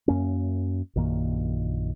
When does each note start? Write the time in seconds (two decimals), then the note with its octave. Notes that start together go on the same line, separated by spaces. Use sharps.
0.08 F#2 A#3 C#4
0.96 A#1 F#2 D#3 A#3